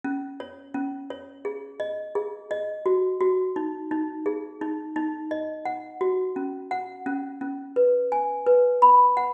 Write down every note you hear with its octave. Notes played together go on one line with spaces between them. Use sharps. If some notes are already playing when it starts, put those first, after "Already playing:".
C#4
C#5
C#4
C#5
G#4
D#5
G#4
D#5
F#4
F#4
D#4
D#4
G#4
D#4
D#4
D#5
F#5
F#4
C#4
F#5
C#4
C#4
B4
G#5
B4
B5
F#5